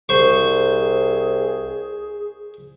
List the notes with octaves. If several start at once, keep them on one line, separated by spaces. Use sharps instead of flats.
C2 G#4 C5 C#6